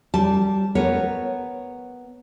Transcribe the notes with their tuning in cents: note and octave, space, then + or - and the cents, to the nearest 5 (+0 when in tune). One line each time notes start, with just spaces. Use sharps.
G3 -15 A5 +0
B3 +0 A#4 +0 C#5 +0